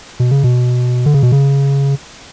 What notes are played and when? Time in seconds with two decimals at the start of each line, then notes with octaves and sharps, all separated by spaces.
0.20 B2
0.31 C#3
0.44 B2
1.06 D3
1.14 C#3
1.23 B2
1.32 C#3